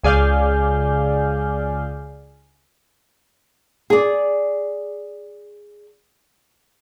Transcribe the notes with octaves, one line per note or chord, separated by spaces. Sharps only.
C#2 G#4 D5 F5 G6
G#4 D5